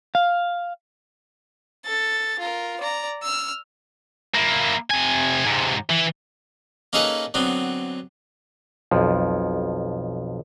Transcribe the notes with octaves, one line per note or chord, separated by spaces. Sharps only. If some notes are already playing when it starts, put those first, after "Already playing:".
F5
A4 A6
F4 A#4
D5 A#5
E6 F6
A#3 E4
C3 G#5
G#2 C3
E3
A#3 C#4 D#4 G#4 A4 B4
D3 F#3 B3 C4
B1 F2 F3